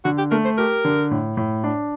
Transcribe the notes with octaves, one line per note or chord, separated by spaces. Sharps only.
D3 F#4
G4
A3 A#4
C5
G4 A#4
D3
A2
A2
D4